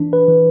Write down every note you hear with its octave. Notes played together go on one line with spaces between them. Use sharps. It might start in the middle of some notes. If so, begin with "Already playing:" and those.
Already playing: E3 D4
B4
E3